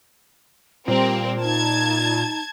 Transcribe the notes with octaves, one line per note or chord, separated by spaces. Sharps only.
A#2 G3 C4 A#4
D#4 A5 G#6